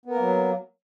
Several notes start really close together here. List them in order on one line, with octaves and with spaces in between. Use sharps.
B3 A#4 A#3 F#3